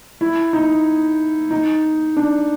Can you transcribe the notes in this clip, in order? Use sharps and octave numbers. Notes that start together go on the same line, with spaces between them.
E4
D#4
D#4
D4